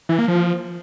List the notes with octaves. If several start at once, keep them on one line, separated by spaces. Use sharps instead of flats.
E3
A#3
F3